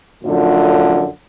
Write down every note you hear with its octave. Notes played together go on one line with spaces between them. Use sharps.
F#2 A2 D3 F3